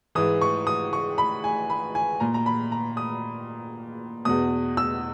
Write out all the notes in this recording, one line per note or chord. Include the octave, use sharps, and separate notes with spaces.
G#2 E3 D#6
C#6
D#6
C#6
B5
G#5
B5
G#5
A#2 A#5
A#5
B5
A#5
D#6
E2 B2 D#6
E6